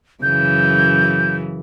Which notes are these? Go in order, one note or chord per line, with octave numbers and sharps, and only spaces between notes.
F#2 C#3 E3 G6